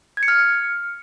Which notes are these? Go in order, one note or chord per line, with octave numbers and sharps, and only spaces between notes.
G#6
C#7
F6